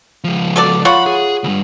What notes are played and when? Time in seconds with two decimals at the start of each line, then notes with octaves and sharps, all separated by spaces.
0.24 C#2 F3
0.56 F#3 A4 D5
0.85 F4 C#5 F#5 B5
1.06 G#4
1.44 D2 G2